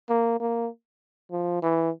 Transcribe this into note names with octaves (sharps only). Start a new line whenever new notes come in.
A#3
A#3
F3
E3